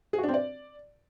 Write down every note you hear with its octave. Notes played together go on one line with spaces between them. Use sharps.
G#4
F#4
D4
C4
D5